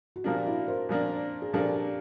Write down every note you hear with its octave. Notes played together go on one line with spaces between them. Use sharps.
F#4
A#2 F3 A#3 D4 F4 G4
E4 F#4
A#4 C5
A#2 F3 A#3 D4
G#4
A#2 F3 A#3 D4 G4 A4